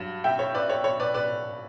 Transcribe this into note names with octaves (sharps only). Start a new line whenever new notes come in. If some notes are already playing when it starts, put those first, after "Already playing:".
Already playing: G2 F#3
E5 G5
C#5
B4 D5
C#5
C#5
B4 D5
B4 D5